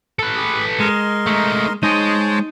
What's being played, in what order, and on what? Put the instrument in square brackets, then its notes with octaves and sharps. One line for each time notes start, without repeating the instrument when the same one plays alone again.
[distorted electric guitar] A4 B4
[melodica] G4 G#4
[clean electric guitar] G#3 [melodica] A#4 D#5 C6
[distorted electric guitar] A3 D#4
[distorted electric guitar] G#3 D#5 [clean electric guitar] D#4 [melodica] C5 C#5 A5